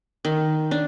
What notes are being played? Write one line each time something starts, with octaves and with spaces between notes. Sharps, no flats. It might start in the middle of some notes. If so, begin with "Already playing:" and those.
D#3
D4